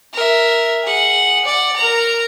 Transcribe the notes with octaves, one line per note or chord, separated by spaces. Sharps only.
A#4 E5
G#4 F#5
D5 F#5
A#4 A#5